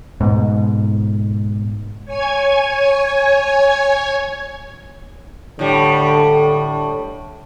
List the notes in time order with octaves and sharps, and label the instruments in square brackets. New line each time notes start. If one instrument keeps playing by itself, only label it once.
[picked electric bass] G#2 B2
[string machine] C#5 G#5 G#6
[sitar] A2 G3 [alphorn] D3